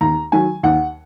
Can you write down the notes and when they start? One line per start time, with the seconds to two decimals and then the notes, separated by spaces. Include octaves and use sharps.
0.01 D#2 A#5
0.32 D#3 F#3 G#5
0.63 D#2 F#5